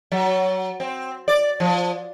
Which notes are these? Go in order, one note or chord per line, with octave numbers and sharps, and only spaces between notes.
F#3
C4
D5
F3